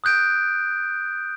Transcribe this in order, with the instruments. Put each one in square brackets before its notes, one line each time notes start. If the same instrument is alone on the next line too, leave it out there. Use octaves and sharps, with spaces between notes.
[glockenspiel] D#6 F#6 G6 D7